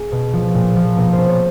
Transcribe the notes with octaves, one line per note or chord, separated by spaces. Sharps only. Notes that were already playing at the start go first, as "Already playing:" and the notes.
Already playing: G#4
B2
F3
A#2
F3
B2 A#4
C5
B2
C#5